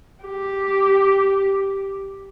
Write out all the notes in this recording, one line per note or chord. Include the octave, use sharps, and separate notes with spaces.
G4